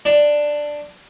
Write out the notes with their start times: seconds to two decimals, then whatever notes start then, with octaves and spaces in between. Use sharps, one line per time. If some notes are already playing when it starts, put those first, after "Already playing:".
0.05 D4